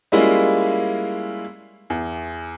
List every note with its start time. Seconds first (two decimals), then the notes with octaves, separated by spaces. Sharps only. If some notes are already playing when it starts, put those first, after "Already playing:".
0.12 G3 G#3 A#3 C#4 E4 F4
1.90 E2